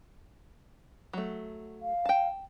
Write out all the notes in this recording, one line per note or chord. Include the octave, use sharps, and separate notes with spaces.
F#3 A3
F5
G5 A5